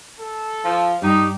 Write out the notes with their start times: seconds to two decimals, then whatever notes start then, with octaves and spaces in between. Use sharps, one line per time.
0.20 A4
0.64 F3
1.02 G2 D#4 G4